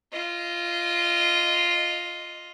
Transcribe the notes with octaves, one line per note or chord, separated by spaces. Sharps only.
F4 D#5